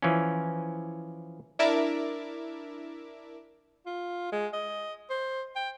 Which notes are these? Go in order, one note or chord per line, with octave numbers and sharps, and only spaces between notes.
E3 F3 C#4
D4 E4 A#4 E5 A5 D6
F4
G#3
D#5
C5
G5